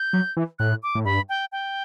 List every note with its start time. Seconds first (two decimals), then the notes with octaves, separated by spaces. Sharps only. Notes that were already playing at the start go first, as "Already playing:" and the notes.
Already playing: G6
0.13 F#3
0.37 E3
0.59 A2 F#6
0.83 D6
0.95 A2
1.05 G2 B5
1.29 G5
1.52 G5